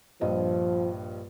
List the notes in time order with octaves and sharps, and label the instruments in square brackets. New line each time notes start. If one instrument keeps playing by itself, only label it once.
[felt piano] A#1 G2 D#5 [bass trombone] F3